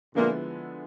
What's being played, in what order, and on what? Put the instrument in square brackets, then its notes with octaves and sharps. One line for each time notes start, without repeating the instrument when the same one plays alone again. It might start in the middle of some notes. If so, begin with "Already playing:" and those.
[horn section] A#2 A#3 [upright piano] D3 F3 G#3 B3 E4